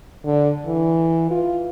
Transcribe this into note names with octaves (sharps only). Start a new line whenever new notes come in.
D3
E3
F4